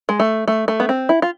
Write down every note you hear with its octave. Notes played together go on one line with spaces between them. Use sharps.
G#3
A3
A3
A3
B3
C4
E4
F4